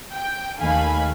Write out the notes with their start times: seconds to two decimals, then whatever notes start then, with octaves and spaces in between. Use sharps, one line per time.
0.13 G5
0.60 D#2 D#3 A3 F5 G#5 B5